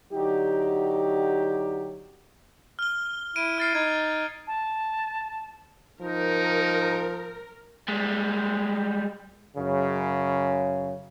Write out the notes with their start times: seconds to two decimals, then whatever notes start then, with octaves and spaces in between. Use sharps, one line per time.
0.13 D3 F#3 D#4 G4
2.79 F6 G7
3.36 E4 D7 D#7
3.58 F6 A6 C7
3.75 D#4 G#6
4.47 A5
6.01 F3 D#4 A#4
7.89 G3 G#3
9.57 F#2 C#3